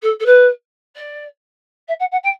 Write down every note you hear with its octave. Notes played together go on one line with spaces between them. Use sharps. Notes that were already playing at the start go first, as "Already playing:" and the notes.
A4
A4
B4
D5
E5
F#5
F#5
G5